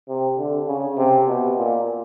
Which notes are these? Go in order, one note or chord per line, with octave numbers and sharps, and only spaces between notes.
C3
D3
C#3
C3
B2
A#2